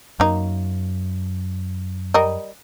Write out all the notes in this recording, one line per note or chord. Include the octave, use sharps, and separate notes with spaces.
F#2 A#3 D#4
G3 A#4 D#5